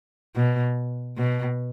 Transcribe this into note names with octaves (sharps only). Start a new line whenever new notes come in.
B2
B2